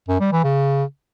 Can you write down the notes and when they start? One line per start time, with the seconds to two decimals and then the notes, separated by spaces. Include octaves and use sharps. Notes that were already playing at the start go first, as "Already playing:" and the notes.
0.09 F#2
0.20 G3
0.32 E3
0.44 C#3